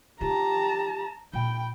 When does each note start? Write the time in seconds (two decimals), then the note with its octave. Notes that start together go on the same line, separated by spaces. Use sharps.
0.21 D#4 F4 G4 A5 A#5
1.33 A#2 G5 B5